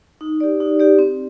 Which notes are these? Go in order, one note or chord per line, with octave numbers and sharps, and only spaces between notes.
D#4
G4 D5
D#4
G4 D5
C4